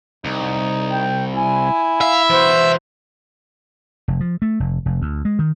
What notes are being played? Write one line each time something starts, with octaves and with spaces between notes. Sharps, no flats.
C2 D#4
G5
E4 G#5
E5 F5
E3 F#4 C5
F1
F3
A3
F1
F1
D2
G#3
D#3